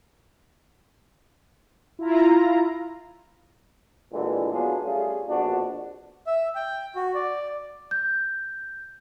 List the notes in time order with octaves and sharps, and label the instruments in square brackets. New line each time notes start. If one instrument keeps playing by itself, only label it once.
[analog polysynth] E4 F4 A#5
[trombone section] A1 A#2 D3 E3 G#3
F#3 A3 B3 D4 F4 G#4
G3 A3 C#4 F4 G#4
A#1 F2 B2 D4 F#4
[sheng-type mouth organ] E5
G5
F#4
D5
[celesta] G6